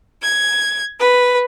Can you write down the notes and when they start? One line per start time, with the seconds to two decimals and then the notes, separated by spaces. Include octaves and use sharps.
0.24 G#6
1.01 B4